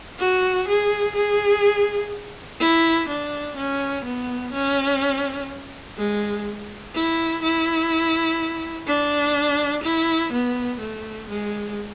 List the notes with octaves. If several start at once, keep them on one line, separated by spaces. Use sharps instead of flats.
F#4
G#4
G#4
E4
D4
C#4
B3
C#4
G#3
E4
E4
D4
E4
B3
A3
G#3